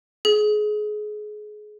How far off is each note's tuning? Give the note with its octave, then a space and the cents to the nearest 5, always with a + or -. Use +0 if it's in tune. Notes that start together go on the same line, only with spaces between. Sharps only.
G#4 +25